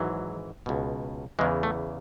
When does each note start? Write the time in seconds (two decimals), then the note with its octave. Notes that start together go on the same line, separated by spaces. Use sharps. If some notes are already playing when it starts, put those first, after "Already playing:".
Already playing: G#1 G#2 E3 F#3
0.66 C#2 B2
1.39 E2 C#3 E3 G#3
1.63 A3